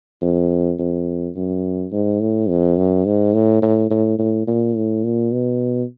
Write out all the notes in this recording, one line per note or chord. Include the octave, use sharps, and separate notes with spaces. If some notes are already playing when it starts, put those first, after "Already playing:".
F2
F2
F#2
G#2
A2
F2
F#2
G#2
A2
A2
A2
A2
A#2
A2
A#2
B2